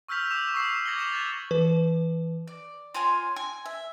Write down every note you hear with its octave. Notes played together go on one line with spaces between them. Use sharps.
C#6 E6 F6 G6 B6 F7
D6 E6 E7 F7
C#6 D#6 E6 C7 E7 F7
D6 G#6 A#6 C#7 F#7 G7
B6 C7 F7
F#6 A6
E3 B4
D5
F4 C#5 G#5 C6
G#5
E5